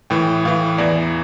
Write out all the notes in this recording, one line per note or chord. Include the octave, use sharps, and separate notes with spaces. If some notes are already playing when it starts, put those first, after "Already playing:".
A2 E3 G5
A2 E3 F5
E2 E3 D5